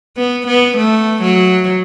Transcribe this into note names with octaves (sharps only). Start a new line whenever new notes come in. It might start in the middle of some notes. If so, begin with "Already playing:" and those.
B3
B3
A3
F#3